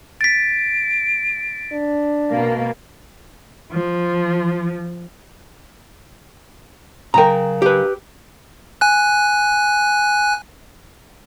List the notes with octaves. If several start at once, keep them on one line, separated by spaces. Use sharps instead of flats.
A6 B6 D7
D4
B2 A#3
F3
C#3 F#3 A#4 G5 A#5
G4 B4
G#5 F#6